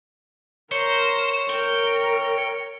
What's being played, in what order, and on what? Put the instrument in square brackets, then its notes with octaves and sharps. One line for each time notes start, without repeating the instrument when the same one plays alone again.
[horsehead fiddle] A#4 [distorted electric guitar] C5 [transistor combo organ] C#5
[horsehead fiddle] A#4 [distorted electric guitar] G5